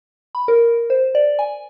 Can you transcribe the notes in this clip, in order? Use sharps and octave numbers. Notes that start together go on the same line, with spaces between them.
B5
A#4
C5
D5
G#5